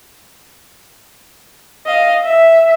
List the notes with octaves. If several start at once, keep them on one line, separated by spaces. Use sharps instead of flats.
D#5 F5
E5